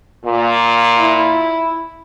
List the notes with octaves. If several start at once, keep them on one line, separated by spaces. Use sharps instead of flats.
A#2
E4